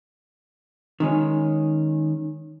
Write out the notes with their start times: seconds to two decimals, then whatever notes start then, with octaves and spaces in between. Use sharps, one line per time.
1.00 D#3 G#3 C#4